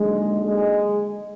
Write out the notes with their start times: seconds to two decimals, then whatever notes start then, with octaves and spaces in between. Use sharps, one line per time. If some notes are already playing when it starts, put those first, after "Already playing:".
Already playing: D#2 D3 F#3 G#3
0.45 G#3